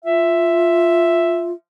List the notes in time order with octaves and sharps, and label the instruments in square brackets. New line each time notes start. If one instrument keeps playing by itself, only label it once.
[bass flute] F4 [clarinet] E5